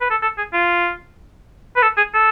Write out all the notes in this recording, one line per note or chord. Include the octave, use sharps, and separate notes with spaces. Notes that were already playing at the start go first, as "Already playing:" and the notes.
B4
A4
A4
G#4
F4
B4
A4
G#4
A4